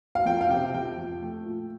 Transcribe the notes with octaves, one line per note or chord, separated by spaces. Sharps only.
F5
F2 G5
F5
C3 G5
F2 G5
F2
A3
A#2